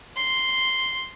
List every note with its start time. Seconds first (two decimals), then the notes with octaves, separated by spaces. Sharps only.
0.16 C6